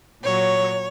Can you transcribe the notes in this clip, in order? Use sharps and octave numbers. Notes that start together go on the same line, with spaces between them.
A#2 F#3 C#5